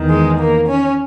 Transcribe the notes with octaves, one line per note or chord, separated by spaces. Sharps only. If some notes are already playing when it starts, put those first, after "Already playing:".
Already playing: E2 D#3
G#3
A#3
C#4